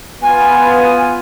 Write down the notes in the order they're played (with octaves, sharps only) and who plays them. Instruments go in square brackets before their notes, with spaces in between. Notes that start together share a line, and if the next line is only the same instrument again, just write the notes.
[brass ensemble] B3 F4 [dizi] G#5